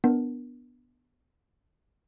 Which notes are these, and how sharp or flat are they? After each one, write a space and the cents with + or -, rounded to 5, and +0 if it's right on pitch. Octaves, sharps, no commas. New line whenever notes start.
B3 -5 D4 +0 A#4 +10